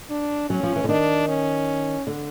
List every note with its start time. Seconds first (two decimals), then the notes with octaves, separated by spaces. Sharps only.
0.10 D4
0.49 F#3 C#4
0.63 F3
0.76 E3
0.84 D3
0.89 D#3 D4
1.28 C#4
2.07 D3